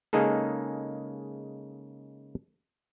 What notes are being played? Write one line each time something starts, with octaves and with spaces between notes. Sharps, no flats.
C#3 G#3 A#3 D#4 G#4 A4